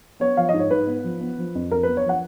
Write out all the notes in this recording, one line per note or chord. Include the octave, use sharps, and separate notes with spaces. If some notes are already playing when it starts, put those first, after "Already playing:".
B3 C#5
F3 F5
D#5
G#2
C#5
G#2 B4
B3
F3
B3
F3
F2
F2 A#4
B3 B4
C#5
F3 F#5